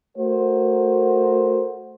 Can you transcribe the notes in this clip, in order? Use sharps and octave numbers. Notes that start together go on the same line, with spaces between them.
A3 F#4 A#4 C5